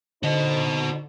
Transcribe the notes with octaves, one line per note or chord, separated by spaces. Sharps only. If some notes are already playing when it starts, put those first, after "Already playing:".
D3 D#4 F#4 C5 D#5